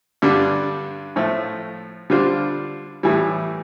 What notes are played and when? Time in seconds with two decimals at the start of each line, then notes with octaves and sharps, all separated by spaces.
0.22 G2 D3 G3 D4
1.16 A2 F3 A3
2.10 D3 G3 D4 F4 C5
3.03 A2 E3 G3